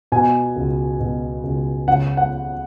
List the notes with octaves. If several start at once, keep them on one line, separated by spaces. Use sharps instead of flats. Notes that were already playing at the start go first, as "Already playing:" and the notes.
B2 G#5
C#2
B2
C#2
C#3 F#5
F#5